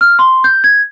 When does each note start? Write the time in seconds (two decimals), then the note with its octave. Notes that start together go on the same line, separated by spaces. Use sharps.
0.01 F6
0.19 C6
0.44 G6
0.64 G#6